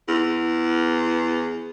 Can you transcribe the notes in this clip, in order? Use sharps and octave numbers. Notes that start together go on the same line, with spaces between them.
E2